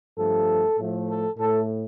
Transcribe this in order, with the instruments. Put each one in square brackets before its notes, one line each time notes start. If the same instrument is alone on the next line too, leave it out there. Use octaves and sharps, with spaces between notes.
[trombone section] G2 F3 A3 A4
A2 F3 A3
A4
A2 A3 A4